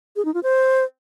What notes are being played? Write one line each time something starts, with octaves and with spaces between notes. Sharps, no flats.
G#4
D#4
F4
C5